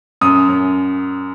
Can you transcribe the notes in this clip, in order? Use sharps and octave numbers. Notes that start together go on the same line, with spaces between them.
F#2 D#6
F#2